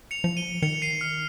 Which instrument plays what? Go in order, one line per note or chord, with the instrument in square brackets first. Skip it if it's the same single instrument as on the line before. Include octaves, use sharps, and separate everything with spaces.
[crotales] C#7 F7
[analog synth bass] F3
[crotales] D#7 G7
[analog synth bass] D#3 [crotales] C#7 F7
[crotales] C#7
C7 D#7
F6